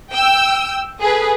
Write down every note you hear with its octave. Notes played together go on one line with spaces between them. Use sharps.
G5 E6
G#4 A4 B4